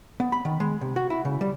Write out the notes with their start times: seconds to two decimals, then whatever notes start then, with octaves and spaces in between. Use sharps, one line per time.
0.20 B3
0.32 B5
0.45 D#3
0.60 G#3
0.81 C3
0.96 F#4
1.10 E4
1.25 C#3
1.41 G3